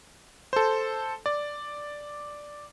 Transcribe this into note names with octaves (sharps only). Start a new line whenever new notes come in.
A4 C5
D5